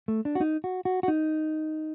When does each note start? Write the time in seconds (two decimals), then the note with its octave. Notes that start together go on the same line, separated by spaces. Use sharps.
0.08 A3
0.25 D4
0.35 F#4
0.41 D#4
0.64 F#4
0.85 F#4
1.03 F#4
1.08 D#4